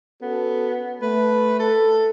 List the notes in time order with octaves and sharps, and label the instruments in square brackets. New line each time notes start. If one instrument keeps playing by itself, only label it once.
[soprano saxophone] B3 [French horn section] C#4 F#4 A4
[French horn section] A3 [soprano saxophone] B4
[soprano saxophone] A4